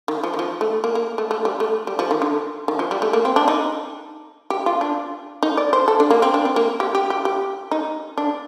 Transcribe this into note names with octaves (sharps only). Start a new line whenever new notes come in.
D#3
F3
D#3
F3
A3
A#3
A#3
A3
A3
G3
A3
G3
F3
D#3
D3
D#3
F3
G3
A3
A#3
C4
D4
D#4
G4
F4
D4
D#4
D5
C5
A4
D4
A#3
C4
D4
C4
A#3
G4
G4
G4
G4
D#4
D4